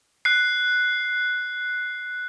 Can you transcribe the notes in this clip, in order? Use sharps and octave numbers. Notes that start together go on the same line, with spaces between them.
F#6 C7